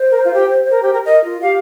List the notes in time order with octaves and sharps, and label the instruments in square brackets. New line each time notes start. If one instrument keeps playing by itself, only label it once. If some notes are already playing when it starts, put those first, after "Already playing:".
Already playing: [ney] C5
[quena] A#4
F4
G4
A#4
G4
A#4
[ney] A#4 [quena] D#5
[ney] F4
[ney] G4 [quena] F5